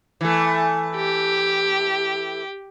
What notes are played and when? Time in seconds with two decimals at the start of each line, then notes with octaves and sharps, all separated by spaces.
0.21 E3 A3
0.96 G4